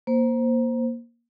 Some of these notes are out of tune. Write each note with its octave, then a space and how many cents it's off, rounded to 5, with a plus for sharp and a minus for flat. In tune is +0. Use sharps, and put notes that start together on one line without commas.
A#3 +15 C5 +0